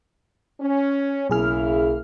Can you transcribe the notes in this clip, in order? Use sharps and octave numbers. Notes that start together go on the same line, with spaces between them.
C#4
B1 C#3 A#3 E4 G#4 F6